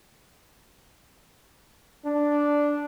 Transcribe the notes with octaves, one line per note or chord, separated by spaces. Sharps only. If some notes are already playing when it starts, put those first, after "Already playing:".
D4